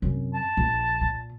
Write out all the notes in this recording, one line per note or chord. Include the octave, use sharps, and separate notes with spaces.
F#2 C3
A5
A#1
A#2